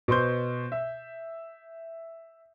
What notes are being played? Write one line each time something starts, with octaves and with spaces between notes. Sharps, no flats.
B2 C5 C6 G6
E5